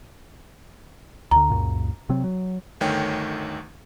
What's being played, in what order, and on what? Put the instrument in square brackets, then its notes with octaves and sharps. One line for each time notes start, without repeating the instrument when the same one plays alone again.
[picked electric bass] D2 D3 [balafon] A#5
[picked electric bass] C#2 F#2 A#2
C3 F#3 C4
F#3
[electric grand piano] G1 D2 D#3 A3 C#5 G5